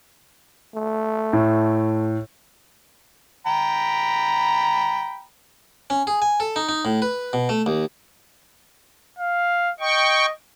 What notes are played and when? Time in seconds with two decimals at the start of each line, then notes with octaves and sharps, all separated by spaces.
0.75 A3
1.33 A2
3.46 G5 A#5 B5
5.90 C#4
6.07 G#4
6.22 G#5
6.40 A4
6.56 D#4
6.69 D#4
6.85 A2
7.02 B4
7.33 B2
7.49 A3
7.66 D#2
9.19 F5
9.80 D#5 G5 C#6